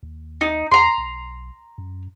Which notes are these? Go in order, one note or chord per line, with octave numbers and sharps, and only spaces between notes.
D#2
D#4
E2 A#5 C6
B1
F#2